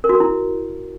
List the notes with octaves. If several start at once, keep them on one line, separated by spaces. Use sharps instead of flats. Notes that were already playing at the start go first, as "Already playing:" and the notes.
A#4
F#4
A#4
E4